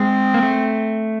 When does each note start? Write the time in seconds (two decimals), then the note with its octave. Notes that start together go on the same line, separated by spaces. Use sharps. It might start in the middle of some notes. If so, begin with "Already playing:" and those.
Already playing: G#3 C4
0.34 A#3
0.43 A3